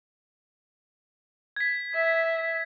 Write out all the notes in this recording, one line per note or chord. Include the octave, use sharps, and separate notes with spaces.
G#6 B6
E5